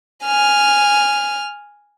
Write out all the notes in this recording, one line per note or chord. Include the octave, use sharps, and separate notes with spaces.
G#5 F6